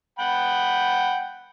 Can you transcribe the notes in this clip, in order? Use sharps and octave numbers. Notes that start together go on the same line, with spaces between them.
F#5 G5 B5